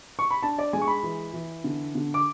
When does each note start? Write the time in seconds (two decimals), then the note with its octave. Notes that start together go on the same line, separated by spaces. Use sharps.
0.19 C#6
0.31 B5
0.43 D4 A5
0.58 D5
0.73 G#3 G#5
0.81 C#6
0.88 B5
1.03 E3
1.33 E3
1.64 D3
1.95 D3
2.14 D6